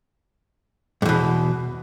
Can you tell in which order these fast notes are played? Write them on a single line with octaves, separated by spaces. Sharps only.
G2 E2 B2